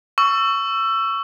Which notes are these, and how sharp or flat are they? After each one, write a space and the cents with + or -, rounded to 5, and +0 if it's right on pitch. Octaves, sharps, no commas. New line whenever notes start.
C#6 +15 E6 +20